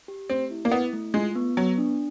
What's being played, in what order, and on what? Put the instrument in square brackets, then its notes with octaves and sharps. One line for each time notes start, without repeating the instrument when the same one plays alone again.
[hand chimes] G4
[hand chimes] A3 [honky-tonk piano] C4
[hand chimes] E4
[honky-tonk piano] A#3
[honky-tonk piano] B3 [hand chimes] E4
[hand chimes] A3
[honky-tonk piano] G#3 [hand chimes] F4
[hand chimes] B3
[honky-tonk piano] F#3 [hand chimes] B3
[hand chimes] D4